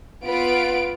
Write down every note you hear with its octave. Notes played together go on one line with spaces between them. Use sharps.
B3 F4 B4 D7